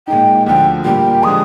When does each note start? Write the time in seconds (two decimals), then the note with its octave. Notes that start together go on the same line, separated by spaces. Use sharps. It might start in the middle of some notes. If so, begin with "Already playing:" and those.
0.07 A#2 G#3 D#4 G5
0.46 D2 D3 F3 G5
0.84 A#2 G3 A#3 F4 G5
1.23 D3 F3 G#3 D#6